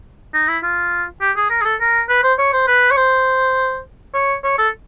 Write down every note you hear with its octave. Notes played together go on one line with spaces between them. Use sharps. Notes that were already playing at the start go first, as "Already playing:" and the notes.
D#4
E4
F4
G4
G#4
A#4
G#4
A4
A#4
B4
C5
C#5
C5
B4
C#5
C5
C#5
C#5
A4